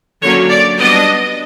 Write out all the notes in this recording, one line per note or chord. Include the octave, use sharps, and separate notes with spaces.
D3 F#3 A#3 C#4 C#5
D5
G3 B3 D4 D#5